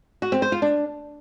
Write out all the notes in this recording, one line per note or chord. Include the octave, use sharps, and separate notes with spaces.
F#4
C4
C5
F4
D4